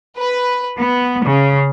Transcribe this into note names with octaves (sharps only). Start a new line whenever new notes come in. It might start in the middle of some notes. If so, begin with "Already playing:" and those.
B4
B3
C#3